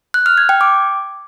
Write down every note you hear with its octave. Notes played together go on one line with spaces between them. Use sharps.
F#6
F6
G#6
G5
D6